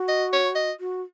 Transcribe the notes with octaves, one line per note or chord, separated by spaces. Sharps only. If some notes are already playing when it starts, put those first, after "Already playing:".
Already playing: F#4
D#5
C#5
D#5
F#4